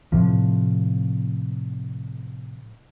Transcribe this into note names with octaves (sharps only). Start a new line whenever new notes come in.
A2 C3 F3